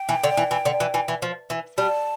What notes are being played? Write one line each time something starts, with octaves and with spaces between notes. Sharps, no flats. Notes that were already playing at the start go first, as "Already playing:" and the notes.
Already playing: G5
E3
D3
E3
E3
D3
E3
E3
E3
F3
E3
G3 A5